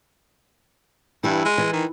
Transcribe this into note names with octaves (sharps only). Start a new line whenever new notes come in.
G2 E3 E4
G#3
E3
D#3